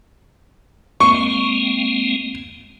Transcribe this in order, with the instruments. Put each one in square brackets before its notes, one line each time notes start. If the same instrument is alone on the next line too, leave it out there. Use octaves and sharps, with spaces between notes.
[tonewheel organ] G#3 A#3 C4 [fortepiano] C#6